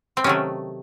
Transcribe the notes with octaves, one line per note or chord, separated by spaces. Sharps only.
C4
C3 D#3 F#3 A3 C#4